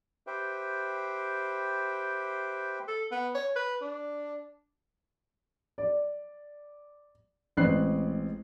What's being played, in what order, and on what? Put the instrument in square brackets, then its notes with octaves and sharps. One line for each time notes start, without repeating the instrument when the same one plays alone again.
[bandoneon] G4 B4 C5 E5 G5
[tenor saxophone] A4
B3
C#5
B4
D4
[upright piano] D5
A1 G#3 C4 F#6 C7